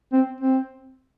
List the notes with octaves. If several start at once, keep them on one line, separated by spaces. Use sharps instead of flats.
C4
C4